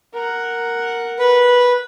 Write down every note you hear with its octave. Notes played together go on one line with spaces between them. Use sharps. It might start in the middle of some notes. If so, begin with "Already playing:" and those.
A#4 F#5
B4